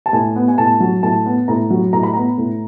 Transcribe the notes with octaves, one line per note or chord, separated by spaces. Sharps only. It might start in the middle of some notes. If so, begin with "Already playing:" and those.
A5
A2 G#5
B3
G#5
A2 A5
F#3
A2 A5
B3
A2 A#5
F#3
A2 A#5
B5
B3 A#5
A2